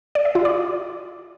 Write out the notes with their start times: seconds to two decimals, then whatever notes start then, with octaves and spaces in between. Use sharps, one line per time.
0.15 D5
0.25 E5
0.35 F4
0.45 D5